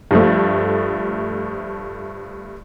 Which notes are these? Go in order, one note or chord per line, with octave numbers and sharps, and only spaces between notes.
G2 F3 A3